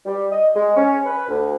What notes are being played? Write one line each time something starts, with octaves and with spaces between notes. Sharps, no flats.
G3
D#5
G#3
C#4
B4
D2